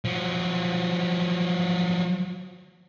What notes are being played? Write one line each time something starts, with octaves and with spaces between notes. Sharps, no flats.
F3 F#3